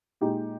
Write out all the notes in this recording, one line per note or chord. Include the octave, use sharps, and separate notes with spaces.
A#2 G#3 D#4 G4